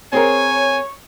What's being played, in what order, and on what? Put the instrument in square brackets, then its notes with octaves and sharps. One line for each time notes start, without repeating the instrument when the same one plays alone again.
[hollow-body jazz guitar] C4 G#4 A#4 [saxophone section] C#5 [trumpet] G#5